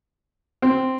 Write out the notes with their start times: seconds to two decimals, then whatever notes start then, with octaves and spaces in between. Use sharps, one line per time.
0.62 C4